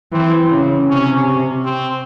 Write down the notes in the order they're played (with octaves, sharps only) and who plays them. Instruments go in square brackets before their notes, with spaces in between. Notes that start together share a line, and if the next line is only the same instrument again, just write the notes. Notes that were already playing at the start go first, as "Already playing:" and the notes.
[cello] E3 [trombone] C4
[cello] C#3
[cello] C3 [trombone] C#4
[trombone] C4